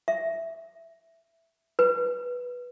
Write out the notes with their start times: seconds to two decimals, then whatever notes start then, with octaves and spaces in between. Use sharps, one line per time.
0.08 E5
1.79 B4